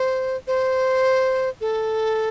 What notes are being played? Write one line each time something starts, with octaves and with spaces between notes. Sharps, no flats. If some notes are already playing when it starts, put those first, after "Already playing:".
Already playing: C5
C5
A4